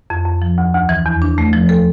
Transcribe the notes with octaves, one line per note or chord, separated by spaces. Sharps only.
F2
F2
F3
D2
D2
E3
E2
D4
A3
F3
A4